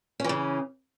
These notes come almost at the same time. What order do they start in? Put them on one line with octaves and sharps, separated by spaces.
C#4 E3 C#3